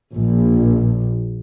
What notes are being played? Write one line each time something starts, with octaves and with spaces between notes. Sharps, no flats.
A#1